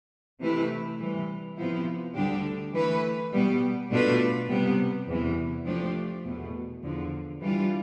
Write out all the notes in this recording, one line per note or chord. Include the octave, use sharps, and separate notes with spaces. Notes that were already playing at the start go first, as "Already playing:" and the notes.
C3 E3 A3 E4 B4
C3 E3 G3
C3 F3 B3 E4
D2 D3 G3 D4 G4
E3 A3 E4 B4
B2 G3 B3
B2 A3 D4 F4 B4
C3 G3 B3
E2 C3 E3
F3 A3 D4 G4
E2 B2 A3
E2 D3 F3
E3 G3 D4 F4